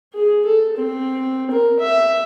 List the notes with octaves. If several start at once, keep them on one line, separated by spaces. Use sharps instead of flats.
G#4
A4
C4
A#4
E5